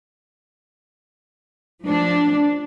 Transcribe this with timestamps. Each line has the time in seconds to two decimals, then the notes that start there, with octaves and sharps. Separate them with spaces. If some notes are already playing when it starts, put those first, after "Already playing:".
1.84 F3 D4